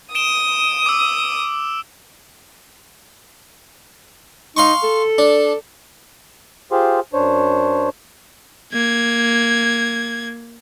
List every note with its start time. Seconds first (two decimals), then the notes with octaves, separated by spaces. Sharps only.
0.15 D#6 D7 E7 G7
0.86 D6 E6
4.57 D#4 F5 C6 C#6
4.83 A4
5.18 D4
6.72 F4 G4 G#4 C5 F5 C6
7.13 F#2 D4 C5 C#5
8.73 A#3 G#6